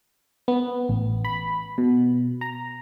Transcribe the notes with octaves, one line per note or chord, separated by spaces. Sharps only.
B3
A1
B5
B2
A#5